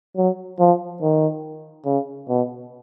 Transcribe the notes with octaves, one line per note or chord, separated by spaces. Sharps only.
F#3
F3
D#3
C#3
B2